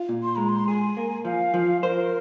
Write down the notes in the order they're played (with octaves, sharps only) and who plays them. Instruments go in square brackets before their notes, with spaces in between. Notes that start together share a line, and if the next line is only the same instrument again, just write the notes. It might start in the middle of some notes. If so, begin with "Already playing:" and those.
Already playing: [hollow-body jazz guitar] F4
A#2
[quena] C6
[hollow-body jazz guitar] G#3 [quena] A#5
[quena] C6
[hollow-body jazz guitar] G#4 [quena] G#5
[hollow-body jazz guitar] A#3
[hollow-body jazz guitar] F3 [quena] F5
[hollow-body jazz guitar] F3
[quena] A#4 [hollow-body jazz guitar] C5